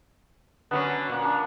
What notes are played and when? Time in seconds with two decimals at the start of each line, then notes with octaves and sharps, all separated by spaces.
0.71 D3 F#3 B3 C#4 F#5
1.09 A#2
1.25 D4